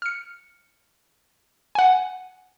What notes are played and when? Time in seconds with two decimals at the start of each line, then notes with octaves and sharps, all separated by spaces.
0.02 F6 C#7
1.75 F#5 G#5